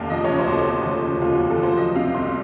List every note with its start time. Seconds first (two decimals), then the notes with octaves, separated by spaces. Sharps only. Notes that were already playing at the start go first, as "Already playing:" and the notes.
Already playing: F1 D#2 C#3 F5 F#5 A5 A#5
0.10 F3 D#5
0.25 C#3 C#5
0.39 C5
0.47 D#2 F#4
0.52 A4
0.66 F1
0.85 F3
1.03 C#3
1.21 D#2 F4
1.35 F#4
1.41 F1
1.50 A4
1.58 F3 C5
1.77 F#3 D#5
1.95 C3 F5
2.15 C2 C6